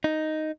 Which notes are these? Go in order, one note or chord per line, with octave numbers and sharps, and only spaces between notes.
D#4